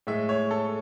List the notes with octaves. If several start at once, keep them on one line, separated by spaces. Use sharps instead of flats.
A2 G#3 E5
C#5
A4